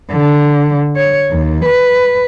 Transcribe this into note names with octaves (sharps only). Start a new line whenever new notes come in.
D3
C#5
D#2
B4